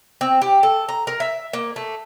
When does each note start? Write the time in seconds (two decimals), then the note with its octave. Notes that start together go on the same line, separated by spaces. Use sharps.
0.21 C4
0.41 G4
0.63 A4
0.89 A#5
1.07 A#4
1.20 E5
1.53 A#3
1.76 A3